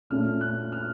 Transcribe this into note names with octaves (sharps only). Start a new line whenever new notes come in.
A#2 A3 C#4 F6
F#6
F6